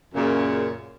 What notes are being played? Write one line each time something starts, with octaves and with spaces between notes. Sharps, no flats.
F#2 A#2 C#3